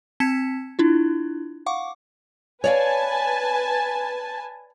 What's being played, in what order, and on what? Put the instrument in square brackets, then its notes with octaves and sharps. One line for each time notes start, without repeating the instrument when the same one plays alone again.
[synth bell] C4 A5 G#6 B6 C#7 E7
D4 E4 F4
F5 F#5 C#6 D6
[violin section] B4 G#5 A5 [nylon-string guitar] C#5 D5 F5